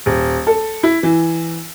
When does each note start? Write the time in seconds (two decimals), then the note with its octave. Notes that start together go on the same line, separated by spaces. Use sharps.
0.06 D#1
0.47 A4
0.83 E4
1.03 E3